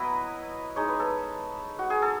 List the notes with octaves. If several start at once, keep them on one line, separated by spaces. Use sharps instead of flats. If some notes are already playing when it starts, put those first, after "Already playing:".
Already playing: F#3 B3 E4 B4 D#5
G#3 D#4 C#5
B4
A4 C#5
F#4
G#4
A4